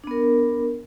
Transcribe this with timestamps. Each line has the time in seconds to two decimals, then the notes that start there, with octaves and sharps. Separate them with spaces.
0.04 D4
0.07 B3
0.11 A#4